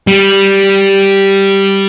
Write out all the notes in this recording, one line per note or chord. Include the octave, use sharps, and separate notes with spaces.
G3